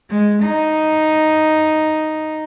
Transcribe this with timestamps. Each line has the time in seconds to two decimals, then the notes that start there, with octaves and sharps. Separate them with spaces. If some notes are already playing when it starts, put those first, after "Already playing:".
0.11 G#3
0.45 D#4